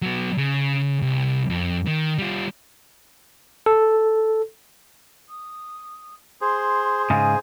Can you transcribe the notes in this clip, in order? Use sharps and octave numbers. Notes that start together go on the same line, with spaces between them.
F#3 B3
C#3
C2
F2
D#3
G3 F4
A4
D#6
G#4 C5 C6
G#2 C#3 G#5